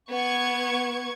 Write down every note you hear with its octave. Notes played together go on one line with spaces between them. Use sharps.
B3 C#6 G#6